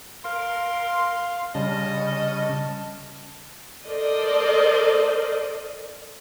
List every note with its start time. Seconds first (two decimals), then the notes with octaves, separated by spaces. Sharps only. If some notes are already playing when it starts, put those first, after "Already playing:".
0.25 A#4 F5 C6
1.55 C#3 G3 C#4 D#5 A5
3.87 A4 A#4 C5 D5 D#5